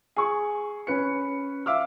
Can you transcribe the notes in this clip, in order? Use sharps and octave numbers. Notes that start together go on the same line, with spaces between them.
G#4 C#6
C#4 B4 C#7
E5 F5 D6 E6 F6